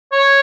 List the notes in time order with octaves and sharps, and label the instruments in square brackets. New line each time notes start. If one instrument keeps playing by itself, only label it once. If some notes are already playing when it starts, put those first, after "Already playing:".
[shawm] C#5